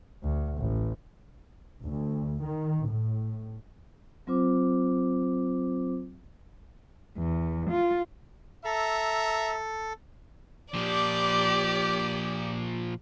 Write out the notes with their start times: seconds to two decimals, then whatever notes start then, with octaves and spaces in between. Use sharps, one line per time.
0.23 D2
0.57 A1
1.84 D2
2.43 D#3
2.87 A2
4.27 F#3 C4 F4 C5 D6
7.18 E2
7.70 F4
8.65 A4 E5 A#5
10.74 A#2 F3 G4 D5